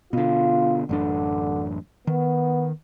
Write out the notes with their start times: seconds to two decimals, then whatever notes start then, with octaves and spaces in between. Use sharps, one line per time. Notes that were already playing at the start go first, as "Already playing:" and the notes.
0.13 B2 D3 F4
0.89 A1 F#2 D3 D4
2.07 D#3 B3